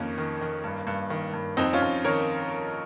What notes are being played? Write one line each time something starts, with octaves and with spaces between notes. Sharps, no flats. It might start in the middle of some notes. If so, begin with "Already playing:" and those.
Already playing: F2 D#3 A#3 C#4
D#3
D#3
G2
G2
D#3
G2
F2 C4 D#4
C#4 F4
F2
D#3 A#4 C#5